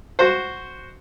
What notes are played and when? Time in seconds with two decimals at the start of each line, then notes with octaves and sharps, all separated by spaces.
0.19 F#4 C5